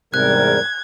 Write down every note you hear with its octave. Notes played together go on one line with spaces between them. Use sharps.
E2 G#2 C3 G3 A#4 F#6 G#6